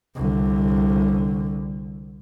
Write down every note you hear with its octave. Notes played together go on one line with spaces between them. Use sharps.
C2 D3